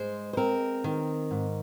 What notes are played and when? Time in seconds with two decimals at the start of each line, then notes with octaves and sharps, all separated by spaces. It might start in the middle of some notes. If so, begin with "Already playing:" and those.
Already playing: G#2 G#3 C5
0.33 C5
0.37 C4 A#4
0.84 D#3
1.31 G#2